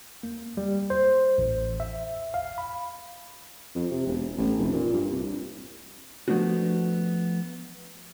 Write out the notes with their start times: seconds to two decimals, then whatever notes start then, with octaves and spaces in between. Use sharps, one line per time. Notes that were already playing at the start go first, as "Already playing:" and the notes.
0.23 A#3
0.57 G3
0.90 C5
1.38 A1
1.80 E5
2.34 F5
2.58 B5
3.75 F2
3.91 C3
4.06 E1
4.37 A1
4.58 F1
4.73 A#2
4.93 G2
5.11 C2
6.28 F3 A3 B3 D4 F#4